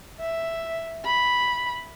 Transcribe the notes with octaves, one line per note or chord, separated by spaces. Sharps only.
E5
B5